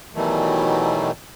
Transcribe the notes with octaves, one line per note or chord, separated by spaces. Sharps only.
B2 D#3 E3 F#3 G3 A3